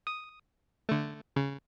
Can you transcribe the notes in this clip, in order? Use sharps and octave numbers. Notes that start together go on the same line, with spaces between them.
D#6
D3 A3
C#3